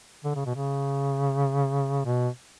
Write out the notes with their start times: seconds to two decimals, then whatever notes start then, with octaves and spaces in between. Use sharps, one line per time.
0.25 D3
0.36 C#3
0.46 B2
0.56 C#3
2.05 B2